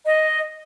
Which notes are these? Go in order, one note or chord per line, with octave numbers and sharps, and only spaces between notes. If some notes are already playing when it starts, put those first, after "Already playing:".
D#5